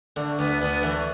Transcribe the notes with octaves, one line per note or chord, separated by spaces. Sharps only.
D3 A3
D2 B3
D2 B3
E3 A3